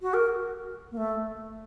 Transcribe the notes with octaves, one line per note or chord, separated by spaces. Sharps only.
F#4
A#4
A#3
A3